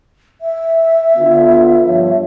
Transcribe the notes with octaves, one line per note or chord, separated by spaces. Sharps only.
E5
D3 B3 F4
G2 F3 C#5